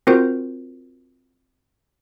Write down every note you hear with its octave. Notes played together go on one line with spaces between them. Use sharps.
C4 F4 F#4 A#4 C5